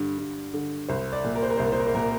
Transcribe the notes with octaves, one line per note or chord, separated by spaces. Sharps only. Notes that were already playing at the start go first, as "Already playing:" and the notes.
Already playing: G2 D3
G2
D3
C2 C5
D5
A#2
A#4
C5
A#4
C2 C5
A#4
C5
A#4
C5
A#2 A#4